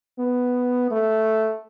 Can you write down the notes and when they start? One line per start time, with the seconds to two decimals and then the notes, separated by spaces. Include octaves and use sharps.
0.18 B3
0.91 A3